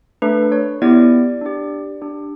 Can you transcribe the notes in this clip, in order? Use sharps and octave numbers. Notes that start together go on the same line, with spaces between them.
A3 D4 A4 B4
C#5
B3 E4 G4 D5
D4 G4
D4 G4